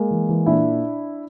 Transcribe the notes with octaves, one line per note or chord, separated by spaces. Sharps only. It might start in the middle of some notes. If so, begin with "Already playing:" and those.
Already playing: G#3 A#3
E3
E3
A#2 D4 E4